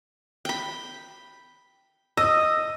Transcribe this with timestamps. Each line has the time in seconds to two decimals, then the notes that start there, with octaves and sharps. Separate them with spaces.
0.45 G5 B5
2.17 D#5 E6